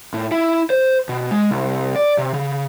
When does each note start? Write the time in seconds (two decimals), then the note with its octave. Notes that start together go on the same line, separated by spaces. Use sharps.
0.14 A2
0.32 E4
0.70 C5
1.09 B2
1.31 G#3
1.51 C2
1.96 D5
2.18 C3
2.34 C#3